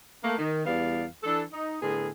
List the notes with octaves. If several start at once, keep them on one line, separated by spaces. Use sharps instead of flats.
A3 A#3
D#3
E2 G3 B3 D5 F5
E3 D4 A4
D#4
A2 D3 B3 G#4